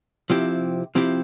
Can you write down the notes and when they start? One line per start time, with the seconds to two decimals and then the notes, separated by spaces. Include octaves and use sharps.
0.30 C3 F3 C4 E4 G4
0.95 C3 F3 C4 E4 G4